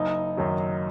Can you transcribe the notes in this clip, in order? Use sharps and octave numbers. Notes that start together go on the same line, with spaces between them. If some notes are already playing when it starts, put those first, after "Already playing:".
Already playing: F#1 D#4
F#2 D#3 F#3